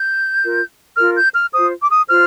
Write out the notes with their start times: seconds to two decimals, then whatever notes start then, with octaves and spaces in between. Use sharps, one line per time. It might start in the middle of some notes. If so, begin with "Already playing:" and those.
Already playing: G6
0.43 F4 A#4
0.97 F4 A#4 F6
1.16 G6
1.34 F6
1.53 F4 C5 D#6
1.84 D6
1.90 D#6
2.08 F4 C5 F6